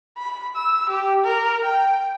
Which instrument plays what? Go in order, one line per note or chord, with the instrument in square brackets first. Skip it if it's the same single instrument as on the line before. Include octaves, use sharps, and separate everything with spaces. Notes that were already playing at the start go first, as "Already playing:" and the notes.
[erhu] B5
E6
G4
A#4
G5